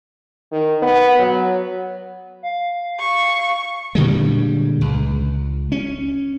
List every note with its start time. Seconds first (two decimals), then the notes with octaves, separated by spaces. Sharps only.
0.52 D#3
0.82 B3
1.19 F#3
2.43 F5
3.00 C#6
3.95 A#2 D3 G3 G#3
4.81 C#2
5.72 C#4